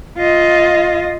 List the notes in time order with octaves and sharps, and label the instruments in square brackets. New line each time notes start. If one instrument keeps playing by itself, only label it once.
[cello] F4 D#5